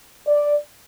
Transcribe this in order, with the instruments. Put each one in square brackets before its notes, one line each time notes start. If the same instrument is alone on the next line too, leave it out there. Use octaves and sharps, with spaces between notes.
[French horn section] D5